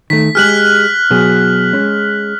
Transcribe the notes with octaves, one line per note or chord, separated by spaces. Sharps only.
D#3 A3 B6
G#3 G4 G#4 F6 F#6 F#7
B2 F#3 G#4
G#3 C#4